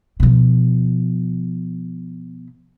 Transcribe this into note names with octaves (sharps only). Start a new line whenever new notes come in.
B2 F3